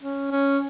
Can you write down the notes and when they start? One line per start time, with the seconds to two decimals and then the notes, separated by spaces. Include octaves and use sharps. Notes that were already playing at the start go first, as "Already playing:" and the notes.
0.01 C#4
0.31 C#4